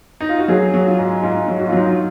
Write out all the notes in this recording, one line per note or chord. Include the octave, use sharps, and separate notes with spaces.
D#4
F4
F#4
F#3 G#4
F#3
F4
G#2
G#2 F4
F#3
F#4
F4
F#3 D#4
F4